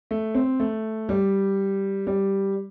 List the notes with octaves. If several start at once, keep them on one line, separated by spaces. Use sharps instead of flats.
A3
C4
A3
G3
G3